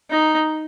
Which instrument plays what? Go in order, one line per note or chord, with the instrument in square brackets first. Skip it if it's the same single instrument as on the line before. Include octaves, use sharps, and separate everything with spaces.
[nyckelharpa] D#4